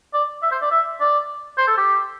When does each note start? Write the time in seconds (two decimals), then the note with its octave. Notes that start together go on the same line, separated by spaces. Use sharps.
0.14 D5
0.42 E5
0.51 C5
0.62 D5
0.71 E5
1.00 D5
1.58 C5
1.68 A4
1.77 G4